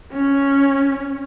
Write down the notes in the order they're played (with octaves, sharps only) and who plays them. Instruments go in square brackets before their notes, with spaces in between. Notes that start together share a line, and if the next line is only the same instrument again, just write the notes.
[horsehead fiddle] C#4